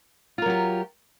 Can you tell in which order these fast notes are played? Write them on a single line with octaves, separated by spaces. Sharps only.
F4 A#4 F#3 G4